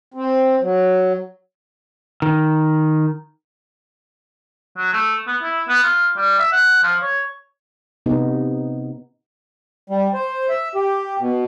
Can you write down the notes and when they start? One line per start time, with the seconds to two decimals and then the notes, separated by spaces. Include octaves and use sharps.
0.14 C4
0.61 F#3
2.22 D#3
4.77 F#3
4.93 A3
5.27 B3
5.42 E4
5.68 B3
5.83 F4
6.16 G3
6.39 E5
6.52 F#5
6.83 F3
7.02 C#5
8.06 C3 B3 D#4
9.90 G3
10.14 C5
10.49 E5
10.75 G4
11.19 B2